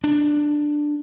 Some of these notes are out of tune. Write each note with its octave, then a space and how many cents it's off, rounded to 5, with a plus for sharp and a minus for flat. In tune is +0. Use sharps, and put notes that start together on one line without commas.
D4 +10